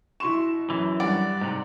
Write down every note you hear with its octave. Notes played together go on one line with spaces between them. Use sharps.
B2 E4 C6 C#6 E7
F#2 E3
G2 D5 F#5
G#2 C3